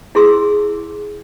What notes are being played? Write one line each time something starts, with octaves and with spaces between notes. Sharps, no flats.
E4 G#4 C6 E6